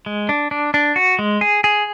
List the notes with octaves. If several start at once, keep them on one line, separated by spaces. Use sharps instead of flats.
G#3
D4
D4
D4
F#4
G#3
G#4
G#4